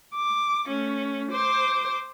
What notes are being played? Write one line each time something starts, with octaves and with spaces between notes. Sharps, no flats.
D6
A3 C#4
C5 D6